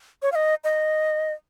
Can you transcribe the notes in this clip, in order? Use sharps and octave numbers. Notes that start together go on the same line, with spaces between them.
C#5
F5
D#5
D#5